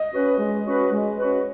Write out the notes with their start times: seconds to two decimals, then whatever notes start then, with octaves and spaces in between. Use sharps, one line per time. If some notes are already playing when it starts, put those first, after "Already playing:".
Already playing: D#5
0.13 C#4 F#4 B4
0.39 G#3
0.66 C#4 F#4 B4
0.92 G#3
1.19 C#4 F#4 B4